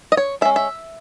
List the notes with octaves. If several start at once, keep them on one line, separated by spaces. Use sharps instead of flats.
D#5
C#5
G#3 C#4 E5
E5